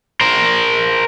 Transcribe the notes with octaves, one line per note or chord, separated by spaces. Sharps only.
A#4 C5